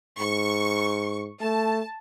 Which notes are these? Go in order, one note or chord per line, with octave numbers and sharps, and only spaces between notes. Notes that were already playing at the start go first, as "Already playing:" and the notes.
G#2 C#6
A3 A5